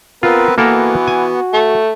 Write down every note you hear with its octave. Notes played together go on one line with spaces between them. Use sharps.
B3 C4 F4 A#4 B4
E3 A#3 B3 F#4 A4 A#4
G#5
A3